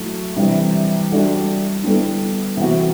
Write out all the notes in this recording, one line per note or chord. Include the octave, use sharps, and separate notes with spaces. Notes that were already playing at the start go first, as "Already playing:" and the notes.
Already playing: F#3 A3 E4
C3 E3 G3 D4
G3 D4 F#4 A4
D3 G3 B3 E4 A4
C3 E3 B3 F#4